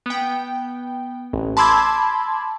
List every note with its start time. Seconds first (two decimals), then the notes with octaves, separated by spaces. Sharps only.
0.06 B3 G5
1.33 A1
1.57 A5 B5 C6 D6 E6 G#6